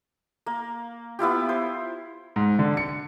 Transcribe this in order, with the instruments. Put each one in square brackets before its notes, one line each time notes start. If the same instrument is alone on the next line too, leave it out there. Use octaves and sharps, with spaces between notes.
[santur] A#3
B3 E4 F4 G4
C5
[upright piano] G#2
D3
C#7